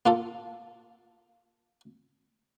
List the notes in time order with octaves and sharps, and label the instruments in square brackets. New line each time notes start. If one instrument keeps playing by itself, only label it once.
[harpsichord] A#3 F4 A4